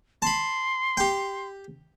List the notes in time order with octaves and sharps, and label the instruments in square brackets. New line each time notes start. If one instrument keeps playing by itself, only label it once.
[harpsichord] A5 B5 [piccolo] C6
[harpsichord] G4 G5